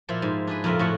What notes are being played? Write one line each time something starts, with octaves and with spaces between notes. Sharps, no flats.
A#2 F3 E4 C5 D5
G#2
D4 G#4 B4
F2 A#2 C#3 F4 A#4 E5
A2 F3 F#4 F#5